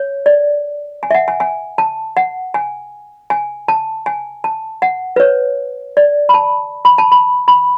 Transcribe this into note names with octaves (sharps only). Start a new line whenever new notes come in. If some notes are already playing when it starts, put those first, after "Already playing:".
Already playing: C#5
D5
G#5
E5
F#5
G#5
G#5
A5
F#5
G#5
G#5
A5
G#5
A5
F#5
B4
C#5
D5
B5
A5
B5
A5
B5
B5